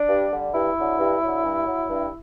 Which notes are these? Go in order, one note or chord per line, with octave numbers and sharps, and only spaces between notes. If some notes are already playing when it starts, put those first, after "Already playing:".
Already playing: D4
G2
D3 G3
G2 E4
D3 F#3
G2
D3 F#3
G2
F#3
G2